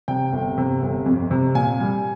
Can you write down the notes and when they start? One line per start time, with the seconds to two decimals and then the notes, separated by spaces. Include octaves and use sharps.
0.08 C3 G5
0.32 G1
0.58 C3
0.82 G1
1.06 F2
1.31 C3
1.55 A#2 G#5
1.80 G3